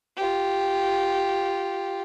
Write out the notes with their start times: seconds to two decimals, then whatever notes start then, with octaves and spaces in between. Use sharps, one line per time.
0.17 F4 G4